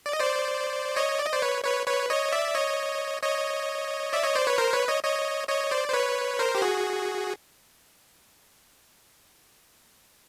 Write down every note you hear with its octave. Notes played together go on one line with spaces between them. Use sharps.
D5
D#5
C5 D5
C#5 D#5
D5
D#5
C5 D5
B4 C#5
B4 C#5
B4 C#5
C#5 D#5
D5 E5
C#5 D#5
C#5 D#5
D5 E5
C#5 D#5
C5 D5
B4 C#5
A#4 C5
B4 C#5
C#5 D#5
C#5 D#5
C#5 D#5
C5 D5
C5
B4 C#5
A#4 C5
G4
F#4 G#4